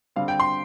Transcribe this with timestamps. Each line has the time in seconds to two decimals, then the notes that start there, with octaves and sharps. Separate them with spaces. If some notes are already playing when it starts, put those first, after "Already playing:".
0.16 D3 G3 C4 F5
0.28 G5
0.40 C6